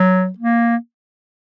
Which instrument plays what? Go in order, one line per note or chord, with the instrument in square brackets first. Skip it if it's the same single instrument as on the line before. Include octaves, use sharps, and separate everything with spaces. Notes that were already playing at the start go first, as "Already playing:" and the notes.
Already playing: [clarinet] F#3
A#3